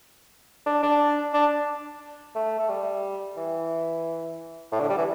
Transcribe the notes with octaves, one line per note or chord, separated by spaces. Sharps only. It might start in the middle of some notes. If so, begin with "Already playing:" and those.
D4
D4
D4
A3
A3
G3
E3
A2
D3
G3
E3